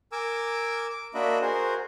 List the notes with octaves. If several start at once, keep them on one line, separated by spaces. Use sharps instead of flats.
A#4 G#5 D6 E6
D6
A#3 D4 F#4 D#5 E5 B5
F#4 G#4 A#4 C5